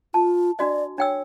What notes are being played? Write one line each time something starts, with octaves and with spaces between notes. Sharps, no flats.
F4 A5
D4 F#4 D5 D#5
D4 C#5 G5 E6